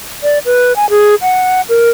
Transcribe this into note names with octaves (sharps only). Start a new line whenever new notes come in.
D5
B4
G#5
G#4
F#5
A#4